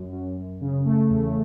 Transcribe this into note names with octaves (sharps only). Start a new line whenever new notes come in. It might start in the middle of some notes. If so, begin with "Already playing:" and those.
Already playing: F#2
F#2
F#2
C#3
A3
E2